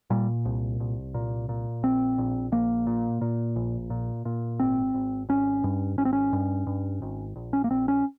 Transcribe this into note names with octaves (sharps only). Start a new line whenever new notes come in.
A#2 G3
C2
C2
A#2
A#2
A#1 C4
A#1
A#1 A#3
A#2
A#2
A#1
A#2
A#2
G#1 C4
G#1
G#1 C#4
G2
G#1 C#4
C4
C#4
G2
G2
G#1
A#1
C#4
A#3
A#1 C4
C#4